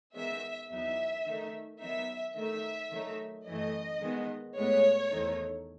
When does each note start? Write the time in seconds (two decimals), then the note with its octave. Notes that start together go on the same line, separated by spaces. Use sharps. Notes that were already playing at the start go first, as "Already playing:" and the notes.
0.14 D#3 G#3 B3 D#4 E5
0.70 E2 B2 F#3 B3 D#4 E5
1.25 D#3 A3 D#4
1.80 D#3 F#3 B3 D#4 E5
2.35 D#3 A3 D#4 E5
2.91 D#3 F#3 A3 D#4
3.46 F#2 E3 A3 D#5
4.01 D#3 G#3 B3
4.57 A2 G#3 B3 C#5
5.12 E2 D#3 A3 D#4